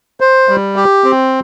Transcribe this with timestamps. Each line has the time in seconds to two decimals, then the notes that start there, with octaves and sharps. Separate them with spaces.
0.20 C5
0.49 G3
0.76 G4
1.04 C4